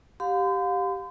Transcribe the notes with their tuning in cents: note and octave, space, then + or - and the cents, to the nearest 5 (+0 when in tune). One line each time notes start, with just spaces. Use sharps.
G4 -5 F5 +30 C6 -45